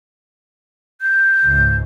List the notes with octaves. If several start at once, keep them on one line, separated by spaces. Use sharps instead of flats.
G6
C#2 G#2